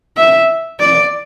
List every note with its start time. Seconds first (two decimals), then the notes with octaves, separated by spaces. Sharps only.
0.17 E5
0.80 D5